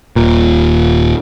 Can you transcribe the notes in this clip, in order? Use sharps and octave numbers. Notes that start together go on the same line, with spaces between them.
D#1 A#2